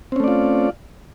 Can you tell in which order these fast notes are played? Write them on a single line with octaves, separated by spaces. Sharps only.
C4 C#4 A3 D5 F4